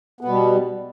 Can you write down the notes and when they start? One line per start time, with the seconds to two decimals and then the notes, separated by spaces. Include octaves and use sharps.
0.21 B3
0.25 B2
0.28 G3